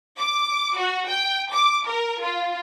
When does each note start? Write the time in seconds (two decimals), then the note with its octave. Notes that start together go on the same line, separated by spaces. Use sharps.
0.19 D6
0.77 F#4
1.09 G5
1.52 D6
1.88 A#4
2.23 F4